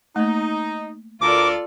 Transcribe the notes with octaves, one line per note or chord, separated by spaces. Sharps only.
A3 A#3 D#4
D2 F4 A4 A#4 D5 D6